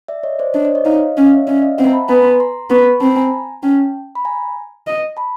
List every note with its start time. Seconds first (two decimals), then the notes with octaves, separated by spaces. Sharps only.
0.08 D5 E5
0.23 C#5 D#5
0.39 C5 D5
0.54 D4 C#5 D#5
0.65 C5 D5
0.75 C#5 D#5
0.85 D#4 D#5 F5
1.17 C#4
1.26 D#5 F5
1.33 E5
1.37 C#5 D#5
1.47 C#4 D5 E5
1.62 D#5 F5
1.78 C4 E5 F#5
1.87 A#5
1.93 A5 B5
2.08 B3 G#5 A#5
2.24 A#5 C6
2.40 A#5 C6
2.70 B3 B5 C#6
3.01 C4 A5 B5
3.17 G#5 A#5
3.63 C#4 G5 A5
4.15 B5
4.25 G#5 A#5
4.87 D#5
5.17 A5 B5